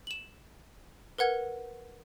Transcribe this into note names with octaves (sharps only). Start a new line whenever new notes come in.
E7 F#7
A#4 B4 F#5 G#6